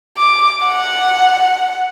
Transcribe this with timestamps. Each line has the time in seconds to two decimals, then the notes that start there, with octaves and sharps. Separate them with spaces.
0.17 D6
0.66 F#5